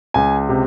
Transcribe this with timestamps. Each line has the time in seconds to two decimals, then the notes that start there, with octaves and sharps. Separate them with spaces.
0.14 C#2 G#5
0.49 C3